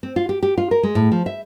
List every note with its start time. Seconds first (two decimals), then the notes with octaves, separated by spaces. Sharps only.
0.03 C4
0.16 F4
0.29 G4
0.43 G4
0.58 F4
0.71 A#4
0.83 G#3
0.95 A2
1.12 F3
1.26 E5